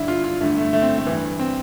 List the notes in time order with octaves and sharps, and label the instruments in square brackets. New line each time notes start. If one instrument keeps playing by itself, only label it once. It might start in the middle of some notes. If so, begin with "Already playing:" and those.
Already playing: [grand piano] G2 D3 E4
F4
F4
G2 A3
D3
A3
A3
C4
A3
G2 E3
C4